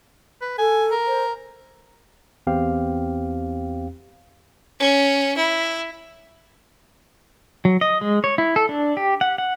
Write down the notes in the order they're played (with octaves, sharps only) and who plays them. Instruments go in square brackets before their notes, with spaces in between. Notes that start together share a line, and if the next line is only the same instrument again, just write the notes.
[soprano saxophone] B4
[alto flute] A4 [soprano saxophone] G#5
[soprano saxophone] A#4
[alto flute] C5
[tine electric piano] E2 C4 G4 F5
[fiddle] C#4
E4
[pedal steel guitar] F#3
D#5
G#3
C#5
E4
A4
D4
G4
F#5
F#5